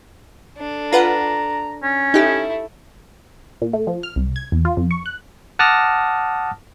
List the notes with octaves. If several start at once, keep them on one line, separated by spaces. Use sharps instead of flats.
D4 A4
F4 B4 F#5 A#5
C#4
A3 D#4 E4 G4
A#2
A3
F3
F6
C2
G#6
E2
F4
F2
C#6
F#6
F#5 A5 D6 D#6 F6 A#6